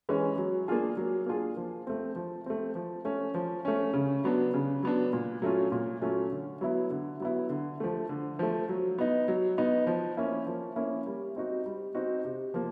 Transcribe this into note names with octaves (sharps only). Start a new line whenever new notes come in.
E3 G#3 C#4
F#3
A#3 D4 F4 G#4
F#3
A#3 D4 F4 G#4
F3
A3 C4
F3
A3 C4
F3
A3 C#4
F3
A3 C#4
C#3
F#3 B3 D4
C#3
F#3 B3 D4
A#2
F#3 A3 C#4 F4
A#2
F#3 A3 C#4 F4
D3
F#3 B3 E4
D3
F#3 B3 E4
D3
F3 A3
D3
F3 A3
F#3
B3 D#4
F#3
B3 D#4
F3
A#3 C#4 E4
F3
A#3 C#4 E4
G3
C4 D#4 F#4
G3
C4 D#4 F#4
C3
F3 A#3